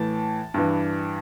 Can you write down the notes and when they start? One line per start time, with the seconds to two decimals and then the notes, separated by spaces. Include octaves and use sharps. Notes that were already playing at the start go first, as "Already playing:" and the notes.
Already playing: A2 E3 A5
0.54 G2 E3